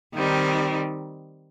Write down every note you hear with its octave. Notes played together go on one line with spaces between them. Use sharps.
D#3 G3 C4 D#4